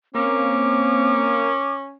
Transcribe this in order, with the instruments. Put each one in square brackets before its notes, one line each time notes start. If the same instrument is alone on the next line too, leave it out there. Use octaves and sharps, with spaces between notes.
[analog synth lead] A#3 [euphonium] C4 [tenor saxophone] C#4 [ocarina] D6